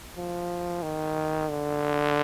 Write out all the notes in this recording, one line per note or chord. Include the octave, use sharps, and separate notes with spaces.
F3
D#3
D3